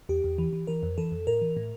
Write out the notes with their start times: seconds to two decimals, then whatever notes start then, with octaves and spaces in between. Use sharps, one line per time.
0.09 E2 G4
0.24 E2
0.38 E3
0.53 E3
0.67 E3 A#4
0.83 F2
0.98 E3 A4
1.12 F2
1.27 A2 A#4
1.41 E3
1.57 A2